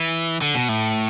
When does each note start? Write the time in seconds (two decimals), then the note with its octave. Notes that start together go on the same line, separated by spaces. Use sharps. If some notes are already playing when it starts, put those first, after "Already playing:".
Already playing: E3
0.42 D3
0.55 B2
0.69 A2